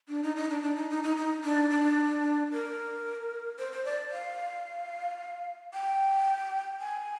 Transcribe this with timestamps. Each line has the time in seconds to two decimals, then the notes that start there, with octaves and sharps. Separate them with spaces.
0.09 D4
0.23 D#4
0.36 D#4
0.50 D4
0.62 D4
0.76 D#4
0.90 D#4
1.04 D#4
1.17 D#4
1.44 D4
1.70 D4
2.52 A#4
3.59 C5
3.72 C5
3.85 D5
4.12 F5
5.74 G5
6.81 G#5